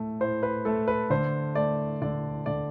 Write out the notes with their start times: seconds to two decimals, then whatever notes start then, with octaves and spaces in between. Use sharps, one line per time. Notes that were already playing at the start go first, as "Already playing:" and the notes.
Already playing: A2 A3
0.20 A2 C5
0.43 B4
0.65 A3 A4
0.88 B4
1.10 D3 C5
1.55 A3 D5
2.02 D3 D5
2.46 D3 D5